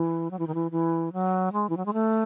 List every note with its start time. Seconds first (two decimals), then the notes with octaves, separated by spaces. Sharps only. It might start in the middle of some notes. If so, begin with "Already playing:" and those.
Already playing: E3
0.31 F#3
0.39 E3
0.47 D#3
0.55 E3
0.71 E3
1.13 F#3
1.53 G#3
1.70 E3
1.77 F#3
1.86 G#3
1.93 A3